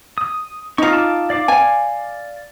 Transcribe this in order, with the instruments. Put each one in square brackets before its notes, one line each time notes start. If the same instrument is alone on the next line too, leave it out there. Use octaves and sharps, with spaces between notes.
[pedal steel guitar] D#6
[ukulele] D#4 F4 [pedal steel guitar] A#5 C#6
[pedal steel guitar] A5 D6
D5 F5 D6
[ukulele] G#5